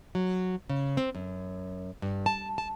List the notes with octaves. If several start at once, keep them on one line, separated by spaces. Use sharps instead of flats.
F#3
C#3
C4
F#2
G2
A5
A5